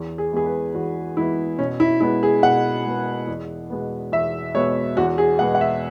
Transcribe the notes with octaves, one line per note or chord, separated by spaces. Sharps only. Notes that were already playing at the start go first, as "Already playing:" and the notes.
Already playing: E2
G#4
E3 G#3 B3 G#4
B4
E2 F#4
E3 G#3 B3 E4
B2 C#4
E4
G#3 B3 E4
G#4
B2 F#5
G#3 B3
E2
B2 G#3 B3
E2 E5
B2 G#3 B3 C#5
E2 F#4
G#4
B2 G#3 B3 F#5
F#5
E5